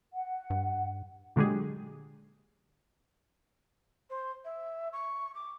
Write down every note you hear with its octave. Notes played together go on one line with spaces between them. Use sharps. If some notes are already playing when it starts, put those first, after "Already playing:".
F#5
G2
A#2 D3 F#3 G#3 G4 G#4
C5
E5
C#6
D6